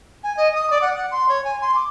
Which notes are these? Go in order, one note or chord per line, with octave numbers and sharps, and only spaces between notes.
G#5
D#5
D#6
D5
F#5
F#5
C6
C#5
G#5
C6
D6